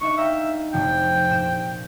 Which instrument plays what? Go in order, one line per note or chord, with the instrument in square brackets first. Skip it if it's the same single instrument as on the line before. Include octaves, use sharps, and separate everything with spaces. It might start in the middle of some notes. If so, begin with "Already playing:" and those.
[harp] D4 D#4 E5 [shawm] C#6
[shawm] E5 [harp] F5 G5 A#5
[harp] F1 C3 F3 [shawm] G5
[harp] A#2 E7